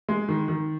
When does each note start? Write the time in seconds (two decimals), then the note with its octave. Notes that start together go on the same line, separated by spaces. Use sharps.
0.09 G#3
0.29 D#3
0.48 D#3